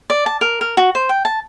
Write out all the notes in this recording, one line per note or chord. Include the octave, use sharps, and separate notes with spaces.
D5
A5
A#4
A#4
F#4
C5
G5
A5